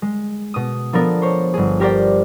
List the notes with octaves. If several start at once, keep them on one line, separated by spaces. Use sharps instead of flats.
G#3
B2 D#6
F3 B3 D4 A4 A#4
C5 C#5
G1 G#4
G4 A#4 C5 D5 G5